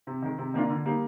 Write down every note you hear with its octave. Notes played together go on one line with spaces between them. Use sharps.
C3
D#3 G#3
C3
D#3 A#3 D4 F4
D3
G3 A#3 D#4